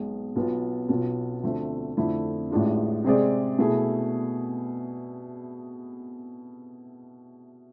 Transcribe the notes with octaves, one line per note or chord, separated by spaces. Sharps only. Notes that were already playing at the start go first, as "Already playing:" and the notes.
Already playing: B1 B2 G#3
B1 B2 B3 F4
B1 B2 B3 F4
D2 D3 F3 A3 C4
F2 D3 A3 E4
A1 A2 G#3 D4 F4
C3 G#3 C4 G#4 D5
B2 A3 E4 G#4